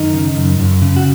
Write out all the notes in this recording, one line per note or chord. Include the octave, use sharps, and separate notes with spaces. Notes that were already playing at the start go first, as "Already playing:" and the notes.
Already playing: F#2 D#3 D#4
C#3
F#2
F#2
C#3
F#4